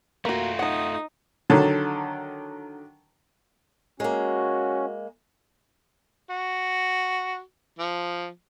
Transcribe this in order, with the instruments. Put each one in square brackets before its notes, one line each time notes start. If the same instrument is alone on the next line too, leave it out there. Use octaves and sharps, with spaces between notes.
[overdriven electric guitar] A3 F4 [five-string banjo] A#3 F#4
[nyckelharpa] D#4 D#6 [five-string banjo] F#5 A5
[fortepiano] D3 D#3 F#3 A5
[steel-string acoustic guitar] G#3 A#3 [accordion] C#4 [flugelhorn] F#4
[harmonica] F#4
F3